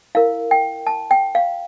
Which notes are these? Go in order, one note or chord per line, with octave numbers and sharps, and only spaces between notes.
E4 A#4 F5
G5
A5
G5
F5